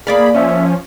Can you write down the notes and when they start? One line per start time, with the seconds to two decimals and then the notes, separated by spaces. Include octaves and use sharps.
0.07 A#3 G#4 D5 F5 B5
0.34 F3 C#4 E5